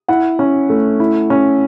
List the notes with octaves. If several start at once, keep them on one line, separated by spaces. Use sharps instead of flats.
E4 F#5
C#4
A3
E4
C#4